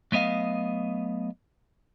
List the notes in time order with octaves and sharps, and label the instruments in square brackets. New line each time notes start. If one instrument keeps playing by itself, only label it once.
[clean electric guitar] F#3 A3 B3 D#5 F5